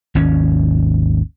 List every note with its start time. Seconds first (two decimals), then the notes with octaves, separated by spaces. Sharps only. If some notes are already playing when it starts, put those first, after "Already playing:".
0.15 G#1 D#2 C#4